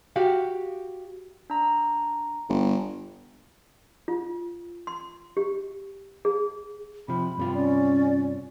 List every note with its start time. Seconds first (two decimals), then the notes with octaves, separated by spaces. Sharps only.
0.16 F#4 G4 F5
1.50 D4 A#5
2.49 G1
4.08 F4
4.87 C6
5.37 G4
6.25 G#4
7.08 C3 F3 B5
7.38 G2 C3 F4
7.54 C#4 D5